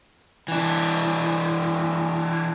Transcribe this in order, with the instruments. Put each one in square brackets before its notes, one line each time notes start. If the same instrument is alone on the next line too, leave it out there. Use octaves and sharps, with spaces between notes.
[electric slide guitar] E3 D4